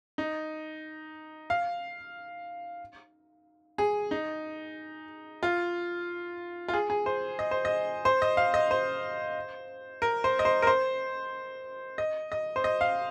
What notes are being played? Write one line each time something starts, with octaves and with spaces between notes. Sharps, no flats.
D#4
F5
G#4
D#4
F4
F4
G#4
G#4
C5
D#5
C5
D#5
C5
D#5
F5
D#5
C5
A#4
C5
D#5
C5
A#4
C5
D#5
D#5
C5
D#5
F5